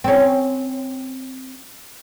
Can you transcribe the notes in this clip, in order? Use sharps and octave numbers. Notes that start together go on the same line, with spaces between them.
C4 C#4